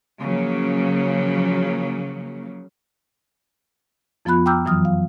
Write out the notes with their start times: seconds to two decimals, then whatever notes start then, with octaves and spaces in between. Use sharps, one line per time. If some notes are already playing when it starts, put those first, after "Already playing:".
0.19 C#3 F3 F#3 A#3
4.25 F2 F3 B3 F4 B5 F#6
4.46 G5 A#5 D6 E6 F6 G6
4.65 F#2 E3 F#3 D#6 F6
4.85 F5